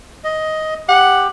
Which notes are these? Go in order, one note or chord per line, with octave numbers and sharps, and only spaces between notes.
D#5
G4 F#5